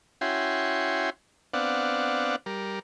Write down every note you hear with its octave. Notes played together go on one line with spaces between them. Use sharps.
C#4 E4 F#4 G5 G#5 C6
B3 C4 D4 D5 F5 F#5
G3 A#4